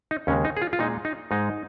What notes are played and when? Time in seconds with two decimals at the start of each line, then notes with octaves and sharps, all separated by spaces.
0.11 D#4
0.27 D#2 C#3 G#3 C#4
0.45 D#4
0.57 G#4
0.62 F4
0.73 F4
0.79 A#2 G#3 D#4
1.05 D#4
1.31 G#2 G#3 D#4